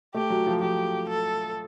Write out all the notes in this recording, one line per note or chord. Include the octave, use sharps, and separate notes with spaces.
A3 G4
F#3
F3
F3 G4
A4